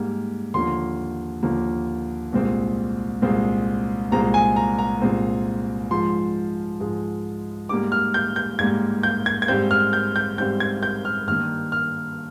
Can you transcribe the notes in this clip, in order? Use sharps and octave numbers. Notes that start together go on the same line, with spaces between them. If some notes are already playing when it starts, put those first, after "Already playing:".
Already playing: G#2 G3 A#3
D#2 D3 F3 A#3 C6
D#2 D3 F3 A#3
C2 A#2 G#3 C4
C2 A#2 G#3 C4
C2 A#2 G#3 C4 A#5
G#5
A#5
A#5
C2 A#2 G#3 C4
G#2 F3 G#3 C6
G#2 F3 G#3
G#2 G3 A#3 D6
F6
G6
G6
G#2 G3 A#3 G#6
G6
G#6
G#6
G#2 G3 C4 G6
F6
G6
G6
G#2 G3 C4 G6
G#6
G6
F6
G2 D#3 A#3 F6
F6